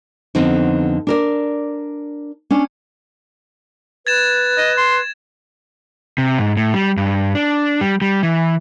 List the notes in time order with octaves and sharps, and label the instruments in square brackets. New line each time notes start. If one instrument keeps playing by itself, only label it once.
[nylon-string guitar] F2 D3 B3 C4 D#4
D4 A#4 D5
C#4 D4
[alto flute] B4 [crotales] G#6 A6 E7
[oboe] D#5
C6
[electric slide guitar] C3
G#2
A2
G3
G2
D4
G3
G3
E3